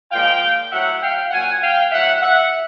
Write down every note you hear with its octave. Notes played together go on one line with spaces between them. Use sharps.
A#2 F3 G#3 F5 G5
A2 F#3 E5 F#5
F5 G5
A#2 F#3 F#5 G#5
F5 G5
A2 F#3 E5 F#5
E5 F#5